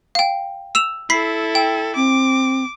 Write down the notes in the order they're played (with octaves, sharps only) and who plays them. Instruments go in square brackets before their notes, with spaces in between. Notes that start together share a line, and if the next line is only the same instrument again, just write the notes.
[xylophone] F5 G5
E6 E7 F7
[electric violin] E4 A4 [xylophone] B5 B6 C7
[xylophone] G5
[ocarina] C4 [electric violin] D6